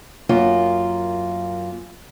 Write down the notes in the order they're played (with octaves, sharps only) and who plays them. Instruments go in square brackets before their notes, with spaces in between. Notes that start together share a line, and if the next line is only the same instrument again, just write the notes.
[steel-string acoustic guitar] F#2 A#3 F4